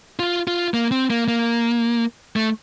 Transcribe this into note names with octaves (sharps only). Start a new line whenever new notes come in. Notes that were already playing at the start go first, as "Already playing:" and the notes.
F4
F4
A#3
C4
A#3
A#3
A3